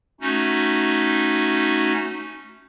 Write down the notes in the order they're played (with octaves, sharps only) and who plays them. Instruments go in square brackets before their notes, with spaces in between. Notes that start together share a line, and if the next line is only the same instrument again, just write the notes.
[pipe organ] A3 C#4 D#4 F#4